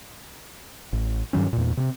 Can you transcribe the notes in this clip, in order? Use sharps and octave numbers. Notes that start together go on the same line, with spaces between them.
A1
G2 D#3 F#3 C#4
E2 A#2
C3 C4